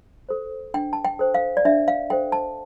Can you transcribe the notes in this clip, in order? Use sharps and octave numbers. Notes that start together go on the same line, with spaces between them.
A4 C5
D4 G5
A5
G5
A4 C5
F5
D5
D4 E5
F5
A4 C5 G5
A5